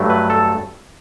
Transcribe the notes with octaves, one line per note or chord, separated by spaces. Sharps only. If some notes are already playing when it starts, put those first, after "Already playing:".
Already playing: G2 F#3 A3
B4
A4